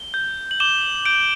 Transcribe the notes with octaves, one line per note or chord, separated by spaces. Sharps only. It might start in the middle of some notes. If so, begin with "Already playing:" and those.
Already playing: G7
G6
F#7
D6 E7 G7
G6 D7 F#7